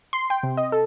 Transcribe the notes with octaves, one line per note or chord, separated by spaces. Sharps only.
C6
G5
C3
D#5
A4